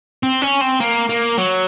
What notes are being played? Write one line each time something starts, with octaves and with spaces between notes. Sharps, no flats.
C4
C#4
C4
A#3
A#3
F#3